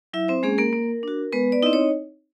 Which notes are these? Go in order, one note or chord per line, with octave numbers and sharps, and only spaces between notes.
F#3 E4 E5
C4 C5
G#3 A#3 C#4 G#4
A#3 A#4
A#3
D4 F#4
G#3 B3 B4
D5
C4 D#4 E4 D#5
C#5